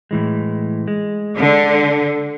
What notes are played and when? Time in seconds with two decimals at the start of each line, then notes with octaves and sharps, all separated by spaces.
0.11 A2 E3 G#3
0.88 G#3
1.36 D3